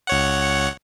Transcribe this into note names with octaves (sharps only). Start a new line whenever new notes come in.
C#2 C#5 F#5